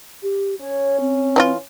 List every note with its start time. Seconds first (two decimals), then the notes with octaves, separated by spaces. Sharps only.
0.23 G4
0.61 C#4 C#5
1.00 C4
1.36 E3 D#4 F4